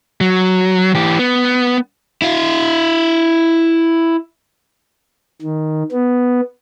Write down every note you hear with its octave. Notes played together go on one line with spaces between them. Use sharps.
F#3
E3 G4
B3
E4 F5
D#3
B3